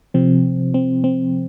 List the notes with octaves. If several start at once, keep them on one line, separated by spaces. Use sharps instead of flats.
C3 F3 C4
C4
C4